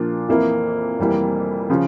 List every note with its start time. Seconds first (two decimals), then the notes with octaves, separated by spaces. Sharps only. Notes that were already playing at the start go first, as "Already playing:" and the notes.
Already playing: A#2 F3 A#3 D4 F4
0.28 F2 E3 A#3 E4
0.98 F1 F2 E3 G3 A#3
1.70 C#3 F3 C#4